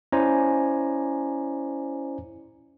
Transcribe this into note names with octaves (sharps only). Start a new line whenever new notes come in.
C#4 E4 C5 D5 G#5 A#5